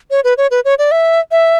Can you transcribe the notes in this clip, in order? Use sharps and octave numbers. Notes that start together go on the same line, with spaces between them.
C#5
B4
C#5
B4
C#5
D5
E5
E5